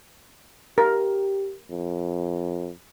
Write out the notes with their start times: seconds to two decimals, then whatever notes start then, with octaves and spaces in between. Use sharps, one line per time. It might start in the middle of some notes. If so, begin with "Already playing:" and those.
0.78 G4 A#4
1.70 F2